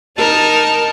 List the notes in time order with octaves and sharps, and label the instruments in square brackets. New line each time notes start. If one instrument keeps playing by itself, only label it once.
[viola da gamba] D#4 A#4 [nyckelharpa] A5